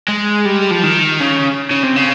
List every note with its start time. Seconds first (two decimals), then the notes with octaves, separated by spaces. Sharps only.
0.08 G#3
0.45 G3
0.71 F3
0.83 D#3
1.20 C#3
1.71 C#3
1.83 C3
1.96 C#3